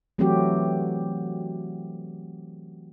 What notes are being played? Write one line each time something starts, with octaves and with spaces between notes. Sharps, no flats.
E3 F#3 A3 C4 F#4 G4